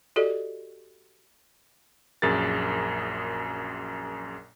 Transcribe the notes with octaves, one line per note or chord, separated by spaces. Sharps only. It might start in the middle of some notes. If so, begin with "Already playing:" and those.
F#4 G4 A4 D5 D#5
A#1 F#2 G#4 A#4 A6